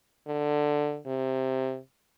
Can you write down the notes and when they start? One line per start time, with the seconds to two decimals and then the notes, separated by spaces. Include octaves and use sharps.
0.27 D3
1.07 C3